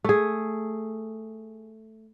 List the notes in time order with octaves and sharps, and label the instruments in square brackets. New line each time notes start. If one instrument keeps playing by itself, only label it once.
[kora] A3 G#4